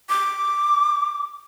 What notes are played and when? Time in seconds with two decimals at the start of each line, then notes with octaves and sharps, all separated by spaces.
0.09 D6